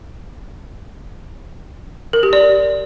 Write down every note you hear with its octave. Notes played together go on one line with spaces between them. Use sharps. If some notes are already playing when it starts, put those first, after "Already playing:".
A#4
G4
D5